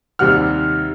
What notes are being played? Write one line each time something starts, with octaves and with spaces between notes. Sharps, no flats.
D#2 C3 G3 F#5 F6